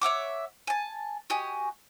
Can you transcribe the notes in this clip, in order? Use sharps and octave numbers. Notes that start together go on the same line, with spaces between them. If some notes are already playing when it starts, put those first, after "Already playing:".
C#5 E5 F#5 D6
G#5 A5
F#4 G4 D#5 G#5